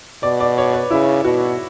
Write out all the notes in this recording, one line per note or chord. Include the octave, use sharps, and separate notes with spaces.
B2 D5
D5
C#5
B4
C#3 E4
B2 F#4